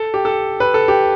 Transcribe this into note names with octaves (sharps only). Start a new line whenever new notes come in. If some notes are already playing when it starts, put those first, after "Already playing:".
Already playing: A4
G4
A4
B4
A4
G4